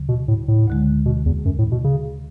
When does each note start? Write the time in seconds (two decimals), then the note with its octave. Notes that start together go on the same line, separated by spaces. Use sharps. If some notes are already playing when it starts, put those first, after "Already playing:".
Already playing: D2 C#3 F#3
0.09 B2
0.28 A2
0.48 A2
0.67 D2 D3 G#3
1.06 B2
1.26 E2
1.45 F#2
1.59 A2
1.72 B2
1.84 C#3